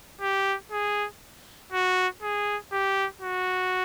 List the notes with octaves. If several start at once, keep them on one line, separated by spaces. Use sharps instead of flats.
G4
G#4
F#4
G#4
G4
F#4